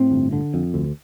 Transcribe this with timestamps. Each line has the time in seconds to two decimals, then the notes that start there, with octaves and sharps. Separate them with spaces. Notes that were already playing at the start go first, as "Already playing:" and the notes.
Already playing: A2 C4
0.11 G1
0.33 D3
0.54 F2
0.74 D2